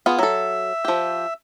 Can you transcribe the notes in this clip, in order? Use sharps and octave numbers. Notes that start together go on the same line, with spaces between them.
B3 F4 G#4
F#3 A4 E5
F3 G4